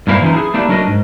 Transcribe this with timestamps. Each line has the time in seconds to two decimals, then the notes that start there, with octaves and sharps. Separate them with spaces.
0.07 G2 A#2 A#3 E4 C5 F5
0.22 E3 F3 C#4 D#4
0.33 E4 F#4 G#4
0.54 A3 A#3 D4 E4 G4
0.69 F#3 D4 F#4 A#4 D#5
0.87 G#2